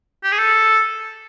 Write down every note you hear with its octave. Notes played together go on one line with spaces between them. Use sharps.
G4
G#4
A4